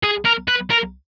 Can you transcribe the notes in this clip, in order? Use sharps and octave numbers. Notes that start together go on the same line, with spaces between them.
G#4
A#4
B4
A#4